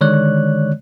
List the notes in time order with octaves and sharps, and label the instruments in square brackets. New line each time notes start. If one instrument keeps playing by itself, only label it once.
[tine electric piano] D3 D#3 G#3 C#5 D5 F#6